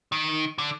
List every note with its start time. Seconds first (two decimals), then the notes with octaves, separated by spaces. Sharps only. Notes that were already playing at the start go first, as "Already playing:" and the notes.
0.12 D#3
0.58 D3